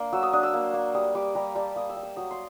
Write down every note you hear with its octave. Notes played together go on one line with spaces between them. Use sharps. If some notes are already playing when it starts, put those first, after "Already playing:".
Already playing: A#3 D4
F#3 E6
D#6
D4 D#6
E6
A#3
A#3
G3 D#6
G3 D6
G3 A#5
G3 A5
A#3 D#6
E6
G3
E6
F#3 D#6
C6